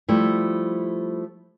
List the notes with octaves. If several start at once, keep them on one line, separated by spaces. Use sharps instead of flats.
F3 G3 A3 E4